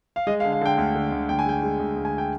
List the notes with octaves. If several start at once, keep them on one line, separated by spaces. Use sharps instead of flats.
F5
G#3 D#5
F5
D3
F5
D3 G5
D2
D3
D2
D2 G5
G#5
G#3 G5
G#3
D2
D2
G#5
G5